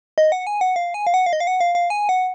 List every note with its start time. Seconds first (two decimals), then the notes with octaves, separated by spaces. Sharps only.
0.18 D#5
0.32 F#5
0.47 G#5
0.61 F#5
0.76 F5
0.94 G#5
1.07 F5
1.14 F#5
1.26 F5
1.33 D#5
1.40 F5
1.47 F#5
1.61 F5
1.75 F5
1.90 G#5
2.09 F#5